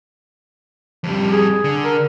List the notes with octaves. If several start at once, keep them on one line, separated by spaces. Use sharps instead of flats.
F2 G3
G#4
D3
A#4